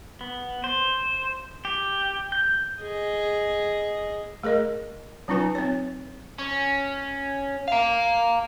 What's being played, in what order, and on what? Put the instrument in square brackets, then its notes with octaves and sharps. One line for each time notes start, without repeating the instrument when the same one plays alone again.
[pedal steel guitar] B3
C5
G4
G6
[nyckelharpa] G#4 D#5
[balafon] A3 G#4 A#4 D#5
F#3 C#4 D#4 F4 B4 G#5
C4 C#5
[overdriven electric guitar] C#4
F5 A#5